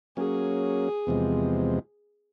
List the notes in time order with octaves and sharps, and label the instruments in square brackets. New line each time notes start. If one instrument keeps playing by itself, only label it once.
[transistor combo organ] F#3 A#3 C#4 [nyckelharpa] G#4
[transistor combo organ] E2 C3 F3 G#3